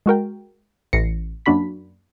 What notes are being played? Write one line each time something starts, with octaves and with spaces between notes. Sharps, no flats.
G#3 F#4 A#4 G5
A1 A2 A#6 C7 C#7
F#2 A#3 D4 F#4 B5 B6